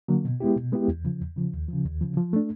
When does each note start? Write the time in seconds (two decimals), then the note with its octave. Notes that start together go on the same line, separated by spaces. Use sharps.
0.08 D3 F#3 A#3
0.25 B2
0.40 G#3 B3 E4 G4
0.56 B2
0.72 G#3 B3 E4 G4
0.88 E2
1.05 C#3 F3
1.21 E2
1.36 C#3 F3
1.53 D#2
1.69 C#3 F3
1.85 D#2
2.01 C#3 F3
2.17 F3
2.33 A3 D4